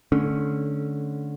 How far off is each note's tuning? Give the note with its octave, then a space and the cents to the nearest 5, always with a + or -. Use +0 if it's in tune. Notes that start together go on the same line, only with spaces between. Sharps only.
D3 +0 A3 -20 C#4 +0